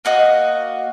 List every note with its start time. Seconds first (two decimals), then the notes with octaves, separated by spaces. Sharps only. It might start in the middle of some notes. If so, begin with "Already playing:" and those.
0.05 A#3 F#4 D#5